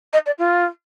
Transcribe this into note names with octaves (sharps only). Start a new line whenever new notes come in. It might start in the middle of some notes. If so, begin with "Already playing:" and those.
D#5
D5
F4